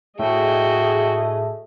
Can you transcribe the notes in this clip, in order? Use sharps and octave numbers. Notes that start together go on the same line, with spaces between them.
A2 A3 F#4 G#4 D#5 G5